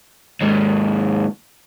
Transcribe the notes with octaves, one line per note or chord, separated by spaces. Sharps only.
D#2 G#2